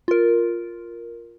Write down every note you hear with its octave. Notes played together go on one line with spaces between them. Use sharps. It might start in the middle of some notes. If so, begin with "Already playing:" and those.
F4 A#4